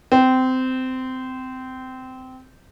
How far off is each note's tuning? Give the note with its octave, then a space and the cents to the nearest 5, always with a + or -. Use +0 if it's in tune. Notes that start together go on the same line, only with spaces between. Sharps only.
C4 -20